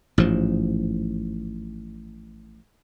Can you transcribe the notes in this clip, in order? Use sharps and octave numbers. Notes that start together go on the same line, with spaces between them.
A1 G#2 F3